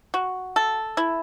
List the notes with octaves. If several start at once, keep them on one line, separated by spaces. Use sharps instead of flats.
F#4
A4
E4